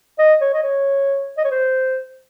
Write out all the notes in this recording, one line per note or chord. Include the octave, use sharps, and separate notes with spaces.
D#5
C#5
D#5
C#5
D#5
C#5
C5